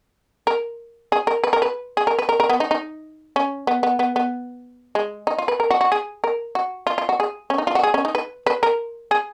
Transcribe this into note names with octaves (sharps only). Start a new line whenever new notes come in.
A#4
G#4
A#4
B4
A#4
B4
G#4
A#4
B4
A#4
A#4
B3
D#4
D#4
C#4
B3
B3
B3
B3
G#3
D#4
F4
B4
A#4
F#4
F#4
G#4
A#4
F#4
F4
F4
F#4
G#4
C#4
D#4
F4
F#4
G#4
C#4
D#4
B4
B4
A#4
G#4